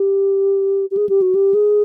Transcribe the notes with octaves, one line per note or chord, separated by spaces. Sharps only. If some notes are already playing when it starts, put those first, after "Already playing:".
Already playing: G4
G4
G#4
G4
F#4
G4
G#4